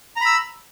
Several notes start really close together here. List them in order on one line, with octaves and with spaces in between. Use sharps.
A#5 B5 E6